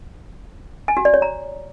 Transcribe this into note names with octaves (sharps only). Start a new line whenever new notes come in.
G#5
F#4
D5
C#5
A#5